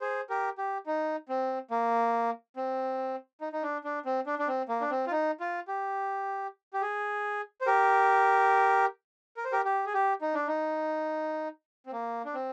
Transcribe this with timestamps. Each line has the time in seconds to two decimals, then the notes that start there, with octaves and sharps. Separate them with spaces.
0.01 G#4 C5
0.30 G4 A#4
0.58 G4
0.86 D#4
1.29 C4
1.71 A#3
2.56 C4
3.41 D#4
3.53 D#4
3.63 D4
3.84 D4
4.05 C4
4.26 D4
4.39 D4
4.48 C4
4.69 A#3
4.81 D4
4.90 C4
5.07 F4
5.11 D#4
5.40 F4
5.68 G4
6.73 G4
6.82 G#4
7.61 C5
7.66 G4 A#4
9.37 A#4
9.45 C5
9.52 G4 A#4
9.65 G4
9.86 G#4
9.94 G4
10.22 D#4
10.34 D4
10.47 D#4
11.86 C4
11.93 A#3
12.25 D4
12.34 C4